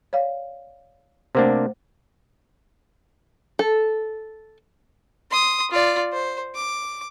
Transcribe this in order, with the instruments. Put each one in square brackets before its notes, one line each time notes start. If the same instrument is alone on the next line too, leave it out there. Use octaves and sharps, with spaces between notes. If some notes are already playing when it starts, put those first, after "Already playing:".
[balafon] C#5 D5 F5
[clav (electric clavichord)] C3 A#3 D4 [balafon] A3 C5
[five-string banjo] A4
[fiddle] C6 D#6
F4 D5
C5
D6